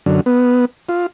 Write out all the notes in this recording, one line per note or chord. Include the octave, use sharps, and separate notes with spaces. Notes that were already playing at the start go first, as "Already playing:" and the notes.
F#2 D3
B3
F4